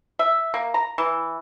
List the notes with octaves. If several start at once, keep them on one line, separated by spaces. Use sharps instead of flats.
E5
A#3
A#5
E3